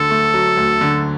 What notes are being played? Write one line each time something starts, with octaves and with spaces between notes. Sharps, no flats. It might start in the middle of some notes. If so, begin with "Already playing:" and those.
Already playing: D2 D3 A4
A3
F#3
D2
D3